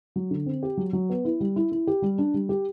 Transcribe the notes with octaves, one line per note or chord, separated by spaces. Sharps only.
F#3
D3
C4
G4
F#3
F#3
B3
E4
G3
E4
E4
G4
G3
D4
G3
G4